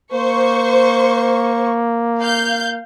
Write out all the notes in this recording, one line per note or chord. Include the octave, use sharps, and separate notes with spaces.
A#3 C5 C#6
F5 G6